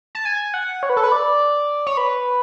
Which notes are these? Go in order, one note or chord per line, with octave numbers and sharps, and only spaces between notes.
A5
G#5
F#5
C#5
B4
A4
B4
D5
C#5
B4